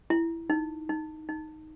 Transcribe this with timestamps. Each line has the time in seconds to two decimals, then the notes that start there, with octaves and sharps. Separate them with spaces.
0.10 E4
0.50 D#4
0.89 D#4
1.29 D#4